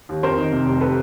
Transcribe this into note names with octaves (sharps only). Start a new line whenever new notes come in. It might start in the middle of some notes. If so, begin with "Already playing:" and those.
D#2
F2 A#4 C5
D#3
C3
F1
A4 B4